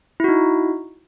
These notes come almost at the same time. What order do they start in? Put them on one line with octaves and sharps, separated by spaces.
E4 F#4 D#4